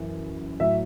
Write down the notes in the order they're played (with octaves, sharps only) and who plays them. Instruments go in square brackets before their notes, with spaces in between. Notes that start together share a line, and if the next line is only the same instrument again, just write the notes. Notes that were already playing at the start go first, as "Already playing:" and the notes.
Already playing: [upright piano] F#2 E3
A2 F#3 E5